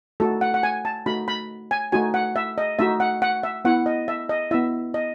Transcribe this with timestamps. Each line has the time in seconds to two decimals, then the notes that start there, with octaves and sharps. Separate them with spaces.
0.20 A3 D#4 F#4 A4
0.41 F#5
0.54 F#5
0.63 G#5
0.85 A5
1.06 A3 D#4 F#4 B5
1.28 B5
1.71 G#5
1.92 A3 D#4 F#4 G#5
2.14 F#5
2.36 E5
2.58 D#5
2.79 A3 D#4 F#4 E5
3.00 F#5
3.22 F#5
3.43 E5
3.65 B3 E4 F#5
3.86 D#5
4.08 E5
4.29 D#5
4.51 B3 E4 E5
4.94 D#5